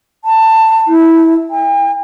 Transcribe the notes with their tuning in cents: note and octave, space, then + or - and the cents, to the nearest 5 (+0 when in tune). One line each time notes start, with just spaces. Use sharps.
A5 +15
E4 -15
G5 +45